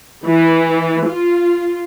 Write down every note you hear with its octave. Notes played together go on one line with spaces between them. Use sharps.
E3
F4